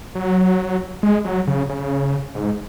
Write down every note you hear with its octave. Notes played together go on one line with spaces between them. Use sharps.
F#3
G#3
F#3
C#3
C#3
G#2